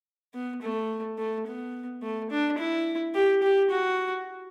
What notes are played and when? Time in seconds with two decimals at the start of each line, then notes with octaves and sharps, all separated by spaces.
0.34 B3
0.62 A3
1.18 A3
1.46 B3
2.02 A3
2.31 D4
2.58 E4
3.14 G4
3.43 G4
3.70 F#4